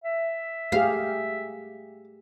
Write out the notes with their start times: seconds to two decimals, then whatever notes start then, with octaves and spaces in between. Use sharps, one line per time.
0.04 E5
0.72 A3 G4 G#4 F5